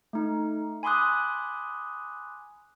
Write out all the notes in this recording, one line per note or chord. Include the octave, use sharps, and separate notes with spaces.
A3 D#4
G#5 B5 C6 D6 D#6 F#6